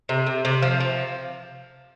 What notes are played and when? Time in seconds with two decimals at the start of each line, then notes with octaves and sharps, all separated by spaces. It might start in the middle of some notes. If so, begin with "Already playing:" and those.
0.09 C3
0.27 C3
0.45 C3
0.62 F3
0.80 F3